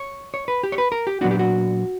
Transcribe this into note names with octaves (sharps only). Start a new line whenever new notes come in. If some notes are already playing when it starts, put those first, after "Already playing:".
Already playing: C#5
C#5
B4
G4
C#5
B4
A#4
G4
A#2 F#3 B3 D4 F#4
G4
F#4